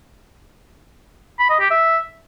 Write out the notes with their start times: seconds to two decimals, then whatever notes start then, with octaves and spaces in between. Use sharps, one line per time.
1.39 B5
1.50 D#5
1.60 G4
1.70 E5